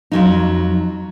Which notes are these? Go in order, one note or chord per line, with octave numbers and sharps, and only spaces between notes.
F2 F#3 D#4